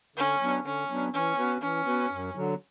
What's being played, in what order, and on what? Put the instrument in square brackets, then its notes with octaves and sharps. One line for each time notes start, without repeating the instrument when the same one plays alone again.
[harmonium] D3 [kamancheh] C#4
[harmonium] F#3 B3 D4
[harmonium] D3 [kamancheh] C#4
[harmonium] F#3 B3 D4
[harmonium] E3 [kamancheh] C#4
[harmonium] B3 F#4 B4
[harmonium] E3 [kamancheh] C#4
[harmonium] B3 F#4 B4
F#2
D3 F#3